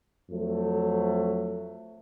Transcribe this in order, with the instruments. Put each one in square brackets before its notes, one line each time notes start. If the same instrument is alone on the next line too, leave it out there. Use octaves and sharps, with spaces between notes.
[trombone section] F2 F#3 A3